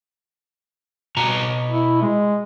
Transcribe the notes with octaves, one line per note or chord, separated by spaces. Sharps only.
B2 F#4 A#5
E4
G#3